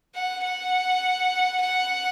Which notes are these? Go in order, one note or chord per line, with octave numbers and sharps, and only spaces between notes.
F#5
F#5
F#5